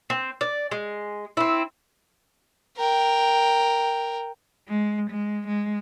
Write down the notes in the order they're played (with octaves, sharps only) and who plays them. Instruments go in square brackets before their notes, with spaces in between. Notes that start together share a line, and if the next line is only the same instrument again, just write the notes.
[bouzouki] C4
D5
G#3
C4 E4
[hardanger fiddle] A#4 G5
[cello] G#3
G#3
G#3